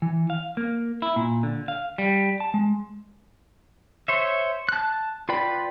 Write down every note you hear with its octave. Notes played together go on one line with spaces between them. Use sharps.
E3
F5
A#3
E4
A#2
D3
F5
G3
A5
G#3
C5 C#5 E5
A5 F#6
F4 B4 D5 G5 B5